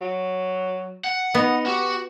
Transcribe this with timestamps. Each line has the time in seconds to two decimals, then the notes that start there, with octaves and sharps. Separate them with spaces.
0.01 F#3
1.04 F#5
1.35 B3 D#4
1.66 F#4 G4